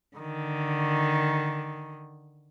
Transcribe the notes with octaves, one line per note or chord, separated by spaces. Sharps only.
D3 D#3